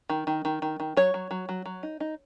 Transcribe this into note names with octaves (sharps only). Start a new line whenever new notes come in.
D#3
D#3
D#3
D#3
D#3
F#3 C#5
F#3
F#3
F#3
F#3
D#4
D#4